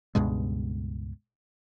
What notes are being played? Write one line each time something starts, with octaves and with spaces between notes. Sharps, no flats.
C#2 G2 B2 G#3